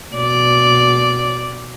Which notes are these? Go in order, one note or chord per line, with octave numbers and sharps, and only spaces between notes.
B2 D5